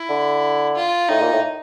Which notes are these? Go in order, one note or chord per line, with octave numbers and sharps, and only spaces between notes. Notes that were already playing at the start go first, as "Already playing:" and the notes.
Already playing: E4
D3
F4
A2 D#4
A#2
A2